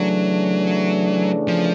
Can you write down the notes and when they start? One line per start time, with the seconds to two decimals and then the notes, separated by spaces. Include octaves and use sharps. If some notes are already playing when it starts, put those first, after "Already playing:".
Already playing: C#3 E3 F#3 A3 D4
1.48 F3